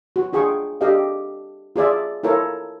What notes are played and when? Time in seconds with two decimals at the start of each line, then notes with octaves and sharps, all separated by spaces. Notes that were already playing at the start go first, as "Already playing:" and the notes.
0.16 F#4
0.33 D4 F4 G#4 G5 C#6
0.81 D4 G4 A4 D#5 F5
1.76 F4 G#4 D5 E5
2.23 E4 F4 A4 A#4 C#5 F5